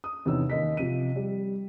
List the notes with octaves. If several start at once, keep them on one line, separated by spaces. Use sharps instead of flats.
D#6
E2 C3 C#4 D#4 E6
D#2 D#5 B6
C3 F3 D#7
G3